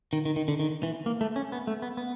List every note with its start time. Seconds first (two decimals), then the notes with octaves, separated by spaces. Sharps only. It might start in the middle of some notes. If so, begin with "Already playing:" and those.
0.13 D#3
0.25 D#3
0.36 D#3
0.48 D3
0.60 D#3
0.83 E3
1.06 A#3
1.21 A3
1.36 C#4
1.52 B3
1.67 A3
1.82 B3
1.97 B3